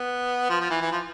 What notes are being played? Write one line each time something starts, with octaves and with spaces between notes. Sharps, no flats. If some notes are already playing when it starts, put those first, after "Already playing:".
Already playing: B3
F3
F3
E3
E3
F3